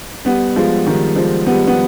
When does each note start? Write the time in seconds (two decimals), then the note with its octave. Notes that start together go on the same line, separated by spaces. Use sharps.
0.25 G3 B3
0.56 F3 G#3
0.86 D#3 G3
1.16 F3 G#3
1.47 G3 B3
1.67 B3